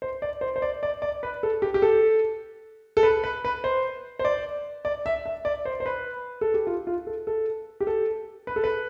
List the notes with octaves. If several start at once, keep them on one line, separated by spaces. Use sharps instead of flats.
C5
D5
C5
C5
D5
D5
D5
B4
A4
G4
G4
A4
A4
B4
B4
B4
C5
C5
D5
D5
E5
E5
D5
C5
C5
B4
A4
G4
F4
F4
A4
A4
G4
A4
B4
A4
B4